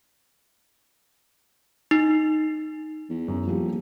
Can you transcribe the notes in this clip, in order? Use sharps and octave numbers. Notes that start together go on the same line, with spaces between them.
D#4
E2
F#2
D#1 F3 G4